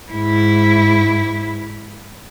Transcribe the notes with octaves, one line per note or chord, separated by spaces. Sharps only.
G#2 E4